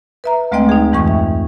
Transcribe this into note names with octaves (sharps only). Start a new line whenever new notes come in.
B4 E5 A#5
D2 G#3 A3 C4 D#5 G5
D#4 G#4
F2 G#2 E3 G#3 G5 C#6
E5